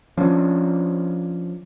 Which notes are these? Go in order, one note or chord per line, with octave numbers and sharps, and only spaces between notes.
F3 C#4 D4